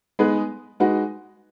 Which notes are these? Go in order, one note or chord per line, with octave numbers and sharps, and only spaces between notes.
G#3 B3 D#4 G#4 B4
G#3 D#4 F#4 B4